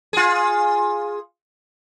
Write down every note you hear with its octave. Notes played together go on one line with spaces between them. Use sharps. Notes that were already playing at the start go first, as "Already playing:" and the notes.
F4 G#4